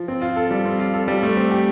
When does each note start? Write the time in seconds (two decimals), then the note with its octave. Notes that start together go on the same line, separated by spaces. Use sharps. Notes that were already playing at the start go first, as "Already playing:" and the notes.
Already playing: F3
0.08 C4
0.22 F4
0.36 A4
0.51 G3
0.65 C4
0.79 F4
0.94 A4
1.08 G3
1.23 A3
1.37 C4
1.51 G4